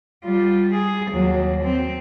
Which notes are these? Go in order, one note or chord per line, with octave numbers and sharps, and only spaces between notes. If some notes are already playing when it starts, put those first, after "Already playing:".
G3 F4
G#4
D#2 F#3
C4